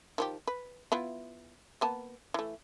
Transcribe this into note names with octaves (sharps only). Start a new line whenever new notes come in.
D#3 F3 G4
B4
B3 E4 F4
A#3 B3 A5
E3 A3